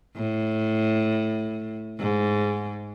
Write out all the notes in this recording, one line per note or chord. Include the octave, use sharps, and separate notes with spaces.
A2
G#2